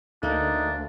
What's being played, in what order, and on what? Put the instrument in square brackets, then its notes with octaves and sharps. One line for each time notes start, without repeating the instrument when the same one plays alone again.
[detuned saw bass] D2 [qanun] A3 A#3 [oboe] D4 [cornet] D#4